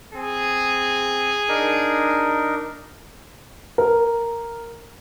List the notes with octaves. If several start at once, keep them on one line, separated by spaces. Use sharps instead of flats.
C4 G#4
D4 D#4 A#4
A#4